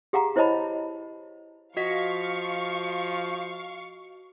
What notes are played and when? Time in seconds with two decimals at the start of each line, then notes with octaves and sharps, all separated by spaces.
0.13 G4 G#4 F5 F#5 A#5
0.36 E4 C5 C#5 D#5 A5 B5
1.77 F3 F#4 D#5 F5 C#6 B6